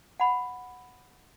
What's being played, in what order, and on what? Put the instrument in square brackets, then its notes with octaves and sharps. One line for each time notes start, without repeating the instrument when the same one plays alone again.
[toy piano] F#5 B5